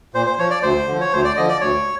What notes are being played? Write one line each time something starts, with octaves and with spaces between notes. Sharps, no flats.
A#2 C5
C5
F3 C#5
D5
D2 C5
D3 F3
C#5
D2 C5
D5
D3 F3 D#5
D5
D2 C#5